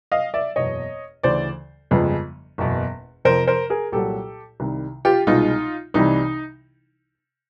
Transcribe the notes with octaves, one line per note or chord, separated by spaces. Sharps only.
D#5 F5
D5 E5
F#1 E2 B2 C#5 D#5
D2 C#3 E3 C5 D5
G1 F2 C#3 F3 G#3
F#1 E2 B2
F2 C3 F3 A#4 C5
A#4 C5
G#4 A#4
C2 A#2 F#3 G4 A4
C2 C3 D#3 G3
F4 G4
C2 B2 G#3 D#4 F4
C2 C3 E3 G3 D#4